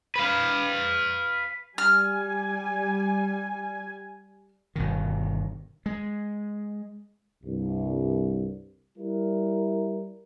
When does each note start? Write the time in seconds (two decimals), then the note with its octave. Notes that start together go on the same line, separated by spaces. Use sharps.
0.16 B4 F5
1.78 G3 G#5 F6
4.76 G1 B2 D#3
5.86 G#3
7.44 C2 G2
8.98 G3 E4 A#4